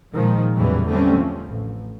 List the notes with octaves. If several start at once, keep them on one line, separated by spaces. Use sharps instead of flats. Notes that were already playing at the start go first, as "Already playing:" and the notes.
A#2 D#3 F3 G#3
E2 A2 C#3 E3 F#3 G3
D3 G3 A3 C4 C#4
F3
A1